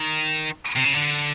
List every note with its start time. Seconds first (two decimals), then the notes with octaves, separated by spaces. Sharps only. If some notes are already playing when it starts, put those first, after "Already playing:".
Already playing: D#3
0.76 C3
0.84 C#3
0.93 D3